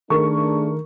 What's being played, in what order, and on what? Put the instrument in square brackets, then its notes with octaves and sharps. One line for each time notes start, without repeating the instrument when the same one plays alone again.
[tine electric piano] D#3 [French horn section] A3 D4 G#4 [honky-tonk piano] A#4 C#6